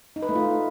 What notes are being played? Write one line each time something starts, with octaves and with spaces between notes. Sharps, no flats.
D#4
B4
A3
F4